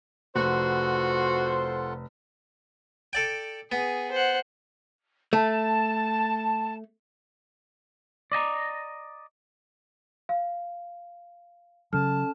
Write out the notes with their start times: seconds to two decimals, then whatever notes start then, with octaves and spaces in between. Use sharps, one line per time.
0.36 F1 F4 F#4 A4 C5 F#5
3.13 A4 D5 G5
3.72 B3 G#4
4.11 C5 F#5
5.33 A3 A5
8.32 D5 D#5 G#5 A#5
10.29 F5
11.93 C#3 F#3 C#4 A4 A5 F6